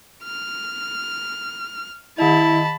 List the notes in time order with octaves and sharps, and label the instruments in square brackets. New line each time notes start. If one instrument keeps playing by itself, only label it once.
[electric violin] F6
[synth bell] D#3 D#5 [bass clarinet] E4 [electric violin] A5 B5